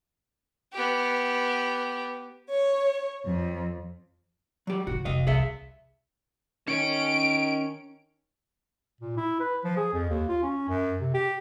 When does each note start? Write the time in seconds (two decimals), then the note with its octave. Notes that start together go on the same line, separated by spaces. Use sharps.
0.72 B3 G4
2.49 C#5
3.24 F2
4.67 F#3 G4
4.87 G#2 D3 F#4
5.05 F1 D#5 F5
5.27 C2 G#4 E5
6.68 D#3 C#4 C#5 D7
9.01 A#2
9.17 E4
9.40 B4
9.64 F3
9.77 G#4
9.93 F2
10.10 D#2
10.29 F4
10.43 C#4
10.68 F#2
11.00 C3
11.14 G4